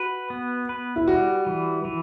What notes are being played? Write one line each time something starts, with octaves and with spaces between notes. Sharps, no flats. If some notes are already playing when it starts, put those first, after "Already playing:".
Already playing: F#4 B4
B3
B4
E4
G3 F#4
E3
E3